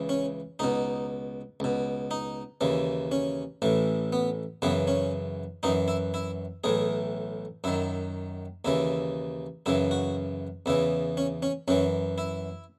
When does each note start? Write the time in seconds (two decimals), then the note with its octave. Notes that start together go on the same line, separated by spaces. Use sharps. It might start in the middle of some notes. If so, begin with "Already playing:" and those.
Already playing: C#2 C#3 E3
0.09 C#4
0.59 C#2 B2 D#4
1.60 C#2 B2
2.11 D#4
2.61 D#2 C#3 E3
3.12 C#4
3.62 A1 A2 E3
4.13 B3
4.62 F#2 C#3 E3 B3
4.87 C#4
5.63 F#2 E3 D#4
5.88 E4
6.14 E4
6.64 B1 A2 E3 G#4
7.64 F#2 D#3 E4
8.65 D#2 C#3 E3 E4
9.66 F#2 C#3 E3 E4
9.91 F#4
10.66 E2 C#3 E3 E4
11.17 C#4
11.42 C#4
11.68 F#2 E3 C#4
12.18 E4